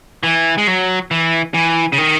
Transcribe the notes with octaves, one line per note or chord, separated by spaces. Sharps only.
E3
G#3
F#3
E3
E3
C#3
D#3